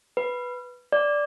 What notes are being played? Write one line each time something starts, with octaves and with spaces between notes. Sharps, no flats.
B4
D5